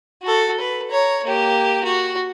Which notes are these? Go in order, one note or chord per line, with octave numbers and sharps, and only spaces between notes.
F#4 A4
B4
C#5 A#5
A#3 G4
F#4